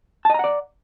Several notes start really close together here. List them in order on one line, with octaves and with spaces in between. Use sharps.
A5 D#5 A#5 F#5 D5